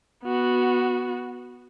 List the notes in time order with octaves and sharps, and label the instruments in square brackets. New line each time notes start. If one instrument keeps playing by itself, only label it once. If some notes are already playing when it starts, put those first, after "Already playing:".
[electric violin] B3 F#4